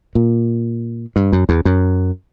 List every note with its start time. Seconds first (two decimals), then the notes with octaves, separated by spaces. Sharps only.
0.15 A#2
1.16 G2
1.32 F#2
1.49 E2
1.65 F#2